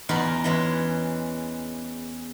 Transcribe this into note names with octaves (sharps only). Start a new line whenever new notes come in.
E2 D#4 F4 D5 F5 B5
E3 G#3 C#4